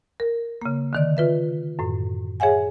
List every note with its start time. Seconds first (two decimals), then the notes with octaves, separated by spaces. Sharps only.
0.20 A#4
0.61 C#3 A#3
0.93 D3 D#3 D5
1.17 F4 B4 E5
1.79 F#2 A2
2.40 G#4 C#5 E5 F#5 G#5